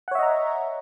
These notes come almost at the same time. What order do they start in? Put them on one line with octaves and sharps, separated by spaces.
F#5 C#5 E5 D#5 A#5